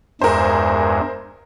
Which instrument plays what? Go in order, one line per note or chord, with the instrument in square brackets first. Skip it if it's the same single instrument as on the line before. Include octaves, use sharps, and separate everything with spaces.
[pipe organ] E2 G2 G#3 [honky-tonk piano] A#4 C5